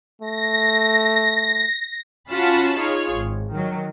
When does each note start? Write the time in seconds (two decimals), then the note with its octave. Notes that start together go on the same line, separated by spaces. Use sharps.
0.22 A3 A#6
2.30 C#4 F4 F#4 F#5 A5 B5
2.75 D#4 F4 G#4 C#5
3.12 G#1
3.53 D#3 F#3